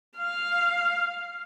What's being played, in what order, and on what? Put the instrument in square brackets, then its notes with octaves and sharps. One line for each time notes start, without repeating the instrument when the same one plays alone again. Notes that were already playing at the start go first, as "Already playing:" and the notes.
[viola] F5